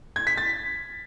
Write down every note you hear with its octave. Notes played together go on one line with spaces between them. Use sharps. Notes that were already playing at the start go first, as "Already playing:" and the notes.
G#6
B6
A6